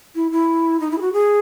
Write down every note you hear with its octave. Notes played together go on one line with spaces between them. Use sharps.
E4
E4
D#4
E4
G#4
F#4
G#4